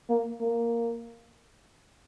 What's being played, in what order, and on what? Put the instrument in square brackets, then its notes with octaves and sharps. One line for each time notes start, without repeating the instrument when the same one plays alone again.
[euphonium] A#3
A#3